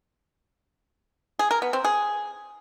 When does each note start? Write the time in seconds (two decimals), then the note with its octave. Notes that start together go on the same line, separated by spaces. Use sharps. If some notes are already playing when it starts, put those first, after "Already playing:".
1.39 G#4
1.51 A#4
1.62 B3
1.73 C4
1.85 G#4